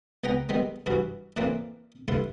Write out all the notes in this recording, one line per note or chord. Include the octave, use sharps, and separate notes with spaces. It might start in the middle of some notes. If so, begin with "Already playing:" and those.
C#2 B3 F#5 G5 A#5
D#3 G3 G#3 B3
G2 E3 E4 F#4
A#2 E3 A3 A#3 C4
G2 D3 A3 E4 C6